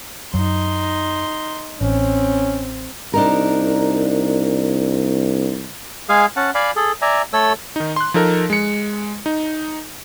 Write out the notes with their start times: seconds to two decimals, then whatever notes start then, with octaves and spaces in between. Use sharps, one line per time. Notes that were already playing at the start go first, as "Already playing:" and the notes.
0.34 F#2 F#3 D#4 C6
1.81 A1 C4 C#4
3.14 C2 D4 D#4 A#4
6.09 G#3 G#4 F5 G#5
6.36 C#4 F#5 A5
6.55 D5 F5 G#5 B5
6.76 G#4 A4
7.02 D5 E5 G#5 A#5
7.33 A3 A4 C#5 E6
7.76 D#3 D#4
7.96 C6 F#6
8.14 F3 D#4 A4 A#4
8.50 G#3 C#7
9.26 D#4